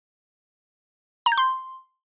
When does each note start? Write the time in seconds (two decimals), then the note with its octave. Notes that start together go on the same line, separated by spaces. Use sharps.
1.26 A#5
1.32 G6
1.37 C6